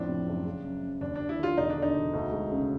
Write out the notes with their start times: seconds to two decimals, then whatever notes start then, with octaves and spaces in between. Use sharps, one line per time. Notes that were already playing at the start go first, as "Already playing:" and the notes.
Already playing: F2 A2 D4
0.08 C3
0.27 F#1
0.45 C#3
0.64 F#2
0.83 F#2
1.01 D#2 D4
1.16 D#2 D4
1.29 E4
1.39 D3 F4
1.57 E1 D#4
1.70 D4
1.76 D3
1.82 D#4
1.95 E1
2.13 D2
2.32 G#3
2.50 C#3